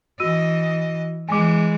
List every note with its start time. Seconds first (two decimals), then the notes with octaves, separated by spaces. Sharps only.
0.20 E3 F#4 D#5 E6 D#7
1.29 E3 G#3 G#5 D6